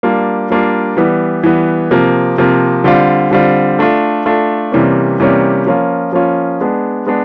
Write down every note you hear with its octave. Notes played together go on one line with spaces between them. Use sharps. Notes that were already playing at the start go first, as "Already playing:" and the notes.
G3 A#3 D4 F4
G3 A#3 D4 F4
E3 G3 B3
E3 G3 B3
C3 F3 A#3
C3 F3 A#3
D3 G3 C4 F4
D3 G3 C4 F4
A3 D4 F4
A3 D4 F4
C3 E3 G3 A#3 C#4
C3 E3 G3 A#3 C#4
F3 A#3 C#4 F4
F3 A#3 C#4 F4
G#3 B3 D4
G#3 B3 D4